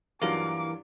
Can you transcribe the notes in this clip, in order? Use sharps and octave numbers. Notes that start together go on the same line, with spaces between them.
G2 E3 F#3 A#3 F4 D6